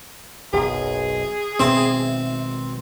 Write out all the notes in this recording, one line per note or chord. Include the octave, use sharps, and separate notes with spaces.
F#1 B1 C#3 G#4
G#1 B2 B3 C4 E5